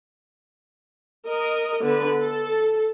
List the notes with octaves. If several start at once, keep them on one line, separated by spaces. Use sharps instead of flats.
A#4 D#5
D3 B3 B4
A4